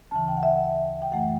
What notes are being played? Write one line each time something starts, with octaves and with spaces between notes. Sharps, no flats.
D2 C#3 E3 A5
G5
F#5
E5
F#5
G5
F#2 E3 A3 F#5